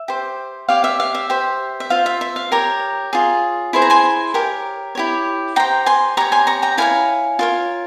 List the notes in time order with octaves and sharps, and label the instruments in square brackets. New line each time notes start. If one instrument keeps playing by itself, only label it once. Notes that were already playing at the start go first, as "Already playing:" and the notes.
Already playing: [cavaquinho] E5
G4 C5
G4 C#5 F5
E5
F5
E5
G4 C5
E5
F4 C5 F5
E5
E5
F5
G4 A#4 C#5 A#5 C#6
F4 G#4 C#5
E4 G#4 C5 C6
A#5
G#5 C6
G4 A#4 C#5
E4 G4 C#5
G4 C5 G5 A#5
G#5 C6
G4 C#5 A#5 C#6
G#5 C6
A#5 C#6
G5 A#5
E4 A#4 C#5 F5 G#5
F4 A#4 C#5